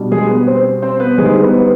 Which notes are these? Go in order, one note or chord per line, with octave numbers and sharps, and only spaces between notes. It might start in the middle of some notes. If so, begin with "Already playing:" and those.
Already playing: B2 G3 D4
G#3 G#4
B3 B4
C4 C5
C4 C5
B3 B4
D3 G3 G#3 C4 D#4 G#4
B3 B4